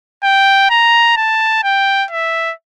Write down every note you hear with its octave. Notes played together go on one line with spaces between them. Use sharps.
G5
A#5
A5
G5
E5